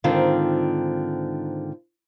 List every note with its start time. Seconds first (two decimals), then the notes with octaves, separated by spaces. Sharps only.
0.04 G#2 D3 D#3 C4 F4